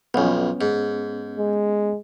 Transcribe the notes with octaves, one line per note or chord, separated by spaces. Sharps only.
B1 F2 B3 C#4
G#2
G#3